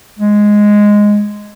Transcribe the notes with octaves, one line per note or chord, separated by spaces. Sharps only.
G#3